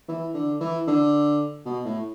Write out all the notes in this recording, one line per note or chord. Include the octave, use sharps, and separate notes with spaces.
E3
D3
E3
D3
B2
A2